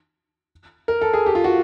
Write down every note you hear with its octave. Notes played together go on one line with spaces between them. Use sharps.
A#4
A4
G#4
G4
F4
F#4